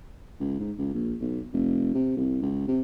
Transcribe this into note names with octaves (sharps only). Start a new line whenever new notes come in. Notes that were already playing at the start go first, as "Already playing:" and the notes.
C#2
G#2
C#2
A#1
B1
F1
C3
C2
C#2
C3